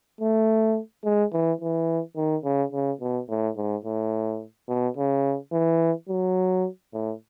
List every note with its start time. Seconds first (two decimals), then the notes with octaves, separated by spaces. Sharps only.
0.21 A3
1.05 G#3
1.33 E3
1.61 E3
2.17 D#3
2.44 C#3
2.72 C#3
3.01 B2
3.29 A2
3.57 G#2
3.85 A2
4.69 B2
4.97 C#3
5.52 E3
6.09 F#3
6.93 A2